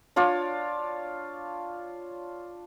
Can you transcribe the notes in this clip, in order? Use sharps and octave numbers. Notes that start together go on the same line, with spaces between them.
D4 F4 C#5 D5